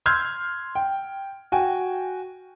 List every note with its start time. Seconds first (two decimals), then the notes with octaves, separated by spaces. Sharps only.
0.06 C6 E6 F6 G6 G#6
0.75 G5
1.52 F#4 G5 G#5